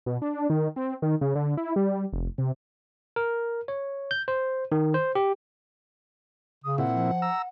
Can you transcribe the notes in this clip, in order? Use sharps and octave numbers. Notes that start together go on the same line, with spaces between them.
B2
D4
D#3
C4
D#3
C#3
D3
E4
G3
F1
C3
A#4
C#5
G6
C5
D#3
C5
G4
C#3 D#6
A#2 C4 E4 F#5
F3
A#5 E6